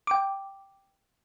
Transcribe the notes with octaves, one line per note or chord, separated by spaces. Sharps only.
G5 D6